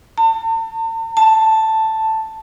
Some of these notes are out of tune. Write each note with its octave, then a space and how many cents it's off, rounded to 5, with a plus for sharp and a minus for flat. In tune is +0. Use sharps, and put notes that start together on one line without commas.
A5 +40
A5 +5